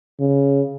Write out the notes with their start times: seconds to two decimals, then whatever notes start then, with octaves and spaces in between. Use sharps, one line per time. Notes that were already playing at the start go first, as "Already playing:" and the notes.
0.19 C#3